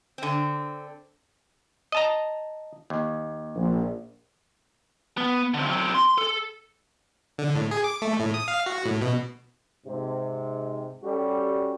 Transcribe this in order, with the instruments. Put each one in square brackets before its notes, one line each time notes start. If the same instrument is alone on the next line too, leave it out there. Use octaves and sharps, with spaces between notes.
[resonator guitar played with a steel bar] D3 C4
[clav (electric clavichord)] D#5 A5 A#5
D#2
[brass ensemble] A#1
[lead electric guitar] B3
D3 C4
F#3 C4
C6
A4
[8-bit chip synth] D3
A2
G#4
D6
A3
A2
D#6
F5
F#4
A2
B2
[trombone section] G#2 C3
G3 C#4 F#4 G4 A4